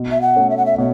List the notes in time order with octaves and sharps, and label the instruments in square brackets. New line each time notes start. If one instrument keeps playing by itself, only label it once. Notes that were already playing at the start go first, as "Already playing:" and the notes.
Already playing: [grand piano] B2
[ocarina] E5
F#5
[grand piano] A3 C#4 A4
[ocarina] E5
F#5
E5
[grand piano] B2 [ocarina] C#5